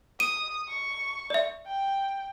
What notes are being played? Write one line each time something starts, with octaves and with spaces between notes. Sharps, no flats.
D#6 D#7
C#6
D5 E5
G5